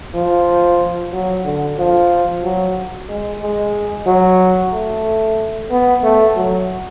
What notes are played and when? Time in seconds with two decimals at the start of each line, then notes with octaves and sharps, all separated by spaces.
0.14 F3
1.12 F#3
1.45 D3
1.78 F3
2.43 F#3
3.09 G#3
3.41 G#3
4.06 F#3
4.72 A3
5.71 B3
6.03 A3
6.36 F#3